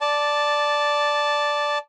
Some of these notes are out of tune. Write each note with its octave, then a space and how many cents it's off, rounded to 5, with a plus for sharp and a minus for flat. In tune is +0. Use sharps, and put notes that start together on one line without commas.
D5 +0 A5 -5